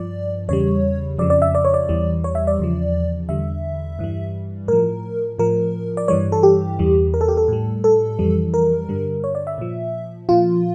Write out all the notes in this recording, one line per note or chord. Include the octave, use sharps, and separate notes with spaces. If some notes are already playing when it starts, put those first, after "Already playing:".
Already playing: G2 F3 D5
E2 C#3 G3 C#5
F2 C#3 F3 D5
D5
E5
D5
C#5
D5
E2 E3 G3
C#5
E5
D5
E2 C#3 F3
E2 D3 G3 E5
G2 E3 G3
A2 F3 A#4
A2 F3 A#4
D5
G2 E3 G3 C#5
A4
G4
E2 E3 G3
A#4
A4
G4
A4
A2 G3
A4
F2 E3 G3
A#4
G2 D3 G3
C#5
D5
E5
A#2 F3
A#2 F3 F4